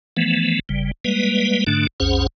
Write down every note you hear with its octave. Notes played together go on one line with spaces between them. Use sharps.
E3 F3 A3 B3
G1 C#3 G3
G3 G#3 A#3 B4
G#2 D3 A3 D4
B1 F2 C#4 G#4 C5 F#5